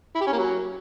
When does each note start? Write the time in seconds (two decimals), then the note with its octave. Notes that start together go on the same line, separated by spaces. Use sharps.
0.15 E4
0.21 G4
0.27 C#4
0.33 A#3
0.38 F#3